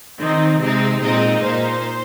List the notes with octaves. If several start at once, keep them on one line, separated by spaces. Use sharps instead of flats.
D#3 C4 D#4
C3 G#3 C4 D#4
A#2 G#3 C4 D#4 D#5
A#2 A#3 D#4 C5